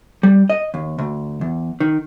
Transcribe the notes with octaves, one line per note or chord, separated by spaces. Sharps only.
G3
D#5
D#2
D2
E2
D#3